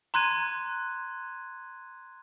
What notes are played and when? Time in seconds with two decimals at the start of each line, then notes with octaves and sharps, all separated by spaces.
0.14 A#5 C6 F#6 G#6 D#7